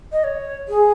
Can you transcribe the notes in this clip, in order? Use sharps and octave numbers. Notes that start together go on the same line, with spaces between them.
D#5
C#5
G#4